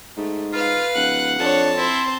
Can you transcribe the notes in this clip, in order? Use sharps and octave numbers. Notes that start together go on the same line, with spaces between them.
G#2 A3
F4 B4 F5
D1 F#5 F#6
F2 D4 C#5 A5
C4 E4 C5